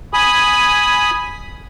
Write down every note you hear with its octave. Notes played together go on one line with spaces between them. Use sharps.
G#5 B5 D#6